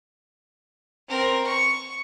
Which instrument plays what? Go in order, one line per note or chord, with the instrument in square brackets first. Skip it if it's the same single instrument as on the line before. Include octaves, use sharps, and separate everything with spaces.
[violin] C4 A#4
C#6